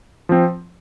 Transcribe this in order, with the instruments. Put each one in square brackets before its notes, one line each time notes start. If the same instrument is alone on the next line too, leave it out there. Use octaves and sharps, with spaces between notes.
[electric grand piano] F3 C4